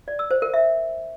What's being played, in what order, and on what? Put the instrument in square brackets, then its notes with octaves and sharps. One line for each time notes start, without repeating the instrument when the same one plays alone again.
[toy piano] D5
E6
C5
A#4
E5